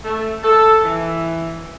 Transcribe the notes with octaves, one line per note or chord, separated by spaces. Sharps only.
A3
A4
E3